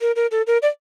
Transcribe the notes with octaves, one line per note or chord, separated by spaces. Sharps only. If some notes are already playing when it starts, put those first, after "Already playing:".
A#4
A#4
A4
A#4
D5